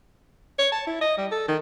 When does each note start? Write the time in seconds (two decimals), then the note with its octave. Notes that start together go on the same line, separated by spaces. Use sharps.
0.59 C#5
0.72 A5
0.87 E4
1.01 D#5
1.17 G3
1.32 A4
1.48 D#3